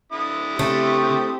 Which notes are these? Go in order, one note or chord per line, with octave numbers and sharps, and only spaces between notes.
D3 E4 D#6
C#3 A3 C4 G4